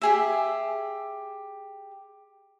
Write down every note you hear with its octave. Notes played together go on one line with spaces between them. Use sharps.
G4 G#4 E5